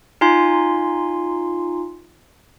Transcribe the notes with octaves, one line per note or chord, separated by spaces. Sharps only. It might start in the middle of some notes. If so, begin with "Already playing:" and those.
D#4 F4 G#5 C6